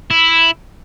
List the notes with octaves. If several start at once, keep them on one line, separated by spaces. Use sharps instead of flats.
E4